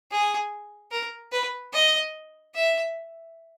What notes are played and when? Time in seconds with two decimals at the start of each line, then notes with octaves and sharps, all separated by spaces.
0.11 G#4
0.91 A#4
1.32 B4
1.73 D#5
2.55 E5